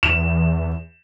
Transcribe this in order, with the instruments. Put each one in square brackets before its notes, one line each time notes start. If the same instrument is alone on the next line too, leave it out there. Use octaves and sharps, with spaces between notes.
[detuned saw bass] E2 [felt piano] E7